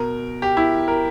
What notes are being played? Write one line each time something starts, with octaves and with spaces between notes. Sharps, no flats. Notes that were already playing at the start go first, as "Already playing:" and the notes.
Already playing: B2 A#4
G4
E4
A#4